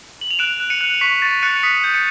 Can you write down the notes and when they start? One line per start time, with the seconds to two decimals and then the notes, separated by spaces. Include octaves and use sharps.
0.21 F#7
0.31 F7
0.39 F#6 D7 E7
0.60 F#6
0.70 C#7 D#7
0.81 F#6
1.01 C#6 B6 C#7
1.22 C#6 A6
1.43 F#6 C#7 D#7
1.63 D#6 B6 C#7
1.84 G6
1.94 C#7 D#7